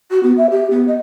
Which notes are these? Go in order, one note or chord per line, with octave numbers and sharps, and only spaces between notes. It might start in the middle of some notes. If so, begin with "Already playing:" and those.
F#4
B3
E5
G4
B3
D#5